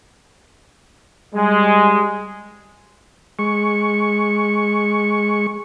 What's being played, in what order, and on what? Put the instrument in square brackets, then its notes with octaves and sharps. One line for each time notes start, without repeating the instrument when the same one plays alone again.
[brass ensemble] G3 G#3
[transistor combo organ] G#3 C#6